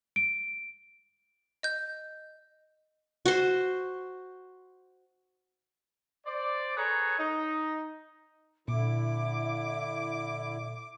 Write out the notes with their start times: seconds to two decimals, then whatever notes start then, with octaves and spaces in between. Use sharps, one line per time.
0.16 D7
1.63 D#5 G6
3.26 F#4 C5
6.26 C5 D5
6.77 G#4 A4 B4 C#5 A#5
7.18 D#4
8.68 A#2 D3 E4 E5 D6